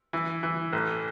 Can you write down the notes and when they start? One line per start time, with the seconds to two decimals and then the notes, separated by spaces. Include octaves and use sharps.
0.13 E3
0.43 E3
0.73 A1